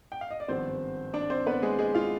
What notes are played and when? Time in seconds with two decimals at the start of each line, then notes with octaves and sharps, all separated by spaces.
0.12 G5
0.21 F5
0.30 D#5
0.40 D5
0.48 G#1 G2 F3 B3 C4 C5
1.13 D4 D5
1.30 C4 C5
1.46 B3 B4
1.62 G#3 G#4
1.79 G#3 G#4
1.95 F4 F5